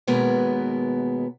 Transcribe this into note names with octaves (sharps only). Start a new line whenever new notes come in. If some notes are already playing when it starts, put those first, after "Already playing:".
D#2 B2 G#3 B3 A#4 B4